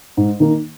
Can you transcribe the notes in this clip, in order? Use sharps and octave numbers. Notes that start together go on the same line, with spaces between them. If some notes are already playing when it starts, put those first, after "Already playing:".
G#2
D#3 A#3 D#4